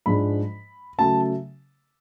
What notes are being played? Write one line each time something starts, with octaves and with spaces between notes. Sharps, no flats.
G#2 F3 G#3 D4 B5
C#3 F#3 A3 A5